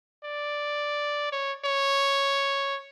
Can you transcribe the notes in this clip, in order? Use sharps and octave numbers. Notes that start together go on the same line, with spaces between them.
D5
C#5
C#5